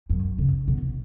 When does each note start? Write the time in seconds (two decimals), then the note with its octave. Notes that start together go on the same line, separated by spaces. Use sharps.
0.10 F#2
0.38 C#3
0.68 B2